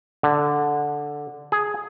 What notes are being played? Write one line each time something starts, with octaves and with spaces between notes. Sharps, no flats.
D3
G#4